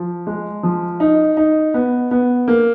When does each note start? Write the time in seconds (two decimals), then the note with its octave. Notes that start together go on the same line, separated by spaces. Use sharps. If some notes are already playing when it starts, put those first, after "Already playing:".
Already playing: F3
0.27 G#3
0.63 F3
1.00 D#4
1.37 D#4
1.74 B3
2.11 B3
2.48 A#3